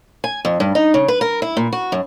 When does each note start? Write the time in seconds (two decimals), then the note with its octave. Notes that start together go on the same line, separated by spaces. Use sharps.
0.24 G#5
0.45 F2
0.60 G2
0.75 D#4
0.94 C#3
1.08 B4
1.21 A#4
1.42 E4
1.57 A#2
1.73 F#4
1.92 F#2